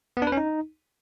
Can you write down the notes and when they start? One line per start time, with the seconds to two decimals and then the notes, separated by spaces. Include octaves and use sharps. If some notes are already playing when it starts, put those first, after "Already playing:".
0.17 B3
0.22 D4
0.27 B4
0.32 C#4
0.37 D#4